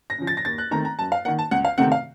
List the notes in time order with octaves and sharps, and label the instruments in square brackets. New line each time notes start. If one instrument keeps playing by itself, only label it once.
[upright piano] A#6
C#3 F3
A6
A#6
D#2 A6
F#6
D#3 A3 C4 A#5
A#5
F#2 A5
F5
D#3 A#3 F#5
A5
C#2 F#5
F5
C3 D#3 A3 C4 F#5
F5